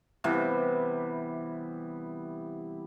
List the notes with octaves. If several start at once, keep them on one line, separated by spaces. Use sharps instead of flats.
C3 E3 G3 B3